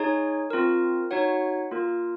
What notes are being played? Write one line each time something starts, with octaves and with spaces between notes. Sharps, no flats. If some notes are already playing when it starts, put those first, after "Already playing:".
Already playing: D#4 G#4 C#5
C4 F4 A#4
D#4 F#4 C#5 F#5
A#3 F4 A#4